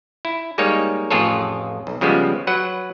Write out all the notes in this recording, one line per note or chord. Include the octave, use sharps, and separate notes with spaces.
E4
G3 G#3 A#3 D#4 C#5
A1 F2 F4 G#4 A4 C#5
B1
C#3 F3 G3 G#3 B3
F#3 B4 F#5